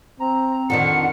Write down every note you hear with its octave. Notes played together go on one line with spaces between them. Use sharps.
C4 A#5
F2 D3 D#3 F#5 C#7